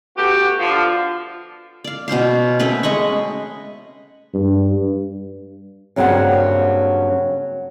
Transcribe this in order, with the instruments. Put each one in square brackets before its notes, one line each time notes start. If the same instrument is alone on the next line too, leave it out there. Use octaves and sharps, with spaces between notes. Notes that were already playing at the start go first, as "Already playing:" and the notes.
[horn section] A3 B3 F#4 G4
D3 F3
[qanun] D5 F5
B2 C#4 C5 F5
A3 C4 C#4 B4
G#3 D#5 B5 C#6
[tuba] G2
[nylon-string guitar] G2 C#3 F#3 A#3 C4 F#5